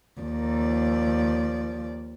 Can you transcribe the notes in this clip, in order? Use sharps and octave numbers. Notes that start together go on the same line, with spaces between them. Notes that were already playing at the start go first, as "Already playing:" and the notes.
D#2 F3 D5